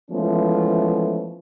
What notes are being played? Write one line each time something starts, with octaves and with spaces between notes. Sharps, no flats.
E3 F3 G#3 A3 B3 C#4